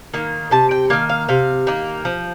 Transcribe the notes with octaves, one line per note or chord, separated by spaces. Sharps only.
D#3 A#3
C3 A5
G5
D#3 A#3 F5
F5
C3 F5
D#3 A#3
F3